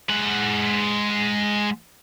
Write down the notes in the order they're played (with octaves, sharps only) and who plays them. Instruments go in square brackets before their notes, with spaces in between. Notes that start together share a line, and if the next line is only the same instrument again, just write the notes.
[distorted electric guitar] G#3 F#5